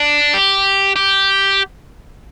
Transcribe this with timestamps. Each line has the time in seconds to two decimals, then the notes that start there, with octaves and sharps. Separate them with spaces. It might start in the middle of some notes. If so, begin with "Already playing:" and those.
Already playing: D4
0.34 G4
0.96 G4